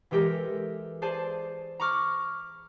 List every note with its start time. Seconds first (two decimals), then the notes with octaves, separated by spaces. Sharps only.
0.11 E3 G#3 G4 A4 A#4
1.02 G#4 C5 D5 A5
1.80 A#5 B5 C#6 D6 F6